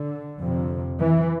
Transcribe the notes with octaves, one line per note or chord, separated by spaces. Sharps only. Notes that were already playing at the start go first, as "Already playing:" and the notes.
Already playing: D3
F2 C3
E3